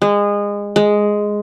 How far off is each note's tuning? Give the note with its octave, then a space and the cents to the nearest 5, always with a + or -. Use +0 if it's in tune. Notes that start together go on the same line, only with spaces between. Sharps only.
G#3 -25
G#3 +0